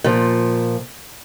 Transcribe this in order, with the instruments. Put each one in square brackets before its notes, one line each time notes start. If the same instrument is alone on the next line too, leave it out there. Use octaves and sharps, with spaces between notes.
[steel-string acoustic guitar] A#2 F3